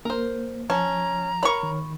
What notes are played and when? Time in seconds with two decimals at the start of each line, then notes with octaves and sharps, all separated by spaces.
0.05 A#3 A#4 C5
0.70 F3 C#4 A5 A#5
1.43 A#4 C#5 B5 C#6
1.63 D#3